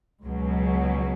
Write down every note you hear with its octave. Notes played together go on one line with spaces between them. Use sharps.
C#2 B2 F#3